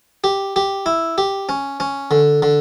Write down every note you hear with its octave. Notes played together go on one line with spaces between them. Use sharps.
G4
G4
E4
G4
C#4
C#4
D3
D3